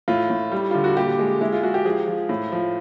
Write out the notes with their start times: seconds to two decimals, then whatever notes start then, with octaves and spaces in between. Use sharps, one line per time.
0.08 A2 F4
0.30 A2
0.52 G3
0.71 D3 F4
0.84 F#4
0.96 A#2 G4
1.19 G#3
1.41 G#3 E4
1.52 F4
1.63 G#3 F#4
1.74 G4
1.85 F3 G#4
2.07 F3
2.29 A2
2.52 F3